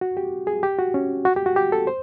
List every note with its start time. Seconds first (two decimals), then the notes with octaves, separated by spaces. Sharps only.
0.01 F#4
0.17 G4
0.47 G#4
0.63 G4
0.78 F#4
0.94 C#4
1.25 F#4
1.36 G4
1.46 F#4
1.56 G4
1.72 A4
1.87 C5